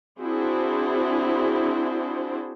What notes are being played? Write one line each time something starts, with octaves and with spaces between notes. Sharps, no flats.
C4 D4 E4 F#4 G#4 C5